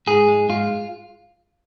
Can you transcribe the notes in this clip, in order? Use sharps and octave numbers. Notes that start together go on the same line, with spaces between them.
G#2 G#4
G#3
G#2 F4